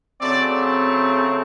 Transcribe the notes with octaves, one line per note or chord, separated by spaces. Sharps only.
C#3 F#3 A3 C4 D5